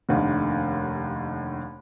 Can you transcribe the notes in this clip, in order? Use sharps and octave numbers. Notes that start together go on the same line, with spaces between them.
F1 D#2 D3 D#3